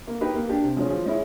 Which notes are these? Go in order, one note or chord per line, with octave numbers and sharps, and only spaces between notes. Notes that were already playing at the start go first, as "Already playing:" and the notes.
A#3
D#4 G4 B4
A#3
D4 G4
C3
F3 G#3 C#4
F3
G#3 C#4 E4